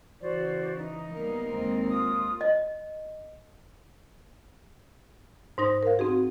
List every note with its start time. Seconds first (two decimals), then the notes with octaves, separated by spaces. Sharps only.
0.21 C#3 E3 F#4 C5 D5
0.77 D#4
1.12 G3 A#3 B3
1.48 D#2 G#3 C4
1.89 F4 D#6
2.41 D#5
5.58 G#2 D#4 C5 A#6
5.83 A#4 F5
5.99 C4 D#4 F#4 G#4